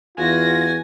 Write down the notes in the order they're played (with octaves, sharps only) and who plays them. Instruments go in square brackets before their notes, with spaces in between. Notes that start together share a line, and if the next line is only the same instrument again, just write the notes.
[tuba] E2 [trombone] F4 [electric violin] F#4 A#6 [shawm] G#5